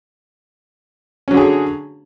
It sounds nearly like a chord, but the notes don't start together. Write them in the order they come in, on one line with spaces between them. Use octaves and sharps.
C#4 F#3 D3 G#4